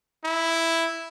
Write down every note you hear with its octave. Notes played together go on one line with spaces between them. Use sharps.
E4